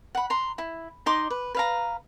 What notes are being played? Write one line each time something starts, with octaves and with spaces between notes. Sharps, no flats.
F#5 B5
A#5 C6
E4
D#4 D#5 C6 D6
B4
B4 F5 A#5